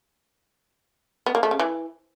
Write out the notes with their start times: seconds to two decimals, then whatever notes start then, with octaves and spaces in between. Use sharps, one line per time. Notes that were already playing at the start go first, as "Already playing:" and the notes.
1.26 B3
1.35 A#3
1.43 A3
1.51 C#3
1.59 E3